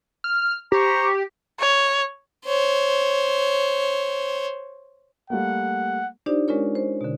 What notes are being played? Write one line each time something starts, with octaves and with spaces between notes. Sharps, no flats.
F6
G4 C5 A#5 C#6
C#5
C5 C#5
G3 A3 A#3 F#5
D4 D#4 F4 G4 C5 D5
G#3 C#4 F4 A#4 C#5
C5
B2 D3